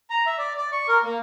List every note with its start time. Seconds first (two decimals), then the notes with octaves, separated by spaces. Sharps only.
0.10 A#5
0.26 E5
0.38 D5
0.57 D5
0.72 C#6
0.88 A#4
1.04 A#3